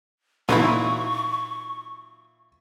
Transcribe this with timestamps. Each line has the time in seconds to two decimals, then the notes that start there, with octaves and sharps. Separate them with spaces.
0.49 A#2 E3 F#3 D#4 E4 C#6